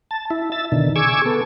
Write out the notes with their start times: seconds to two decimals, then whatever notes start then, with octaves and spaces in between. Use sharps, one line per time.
0.11 A5
0.31 E4
0.52 E5 A6
0.72 B2 D3 D#3
0.96 G#4 C#6 D6 E6 G#6
1.26 B3 A4